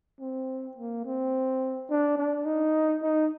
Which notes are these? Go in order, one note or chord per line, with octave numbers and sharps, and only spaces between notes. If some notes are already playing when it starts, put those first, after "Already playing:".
C4
A#3
C4
D4
D4
D#4
D#4